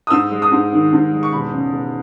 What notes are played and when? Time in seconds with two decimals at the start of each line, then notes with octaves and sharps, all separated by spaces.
0.07 D#6
0.11 G#2 E6
0.31 G#3
0.42 D#6
0.52 G#2
0.72 D#3
0.93 G#2
1.13 G#3
1.23 C#6
1.33 E1 B5
1.54 C#3
1.73 E1